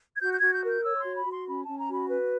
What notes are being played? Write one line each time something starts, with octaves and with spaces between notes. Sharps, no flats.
G#6
F#4 G6
G6
F#4 G#6
G6
A#4
G6
C#5 E6
C#6
C6
F#4
B5
F#4
C6
C#4 B5
A5
C#4
A#5
F#4 B5
B4